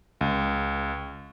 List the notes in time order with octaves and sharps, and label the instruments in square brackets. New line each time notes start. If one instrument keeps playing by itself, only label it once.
[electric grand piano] C#2